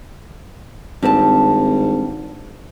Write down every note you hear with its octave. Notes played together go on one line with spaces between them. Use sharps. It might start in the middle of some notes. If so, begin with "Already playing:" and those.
G#1 G2 C4 A5